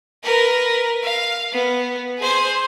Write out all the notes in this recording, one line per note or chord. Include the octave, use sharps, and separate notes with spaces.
A#4 B4
F5
B3
G#4 C5